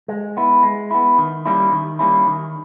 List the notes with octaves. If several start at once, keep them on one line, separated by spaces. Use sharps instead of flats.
G#3
B3 E4
G#3
B3 E4
D#3
G3 A#3 C#4 E4
D#3
G3 A#3 C#4 E4
D#3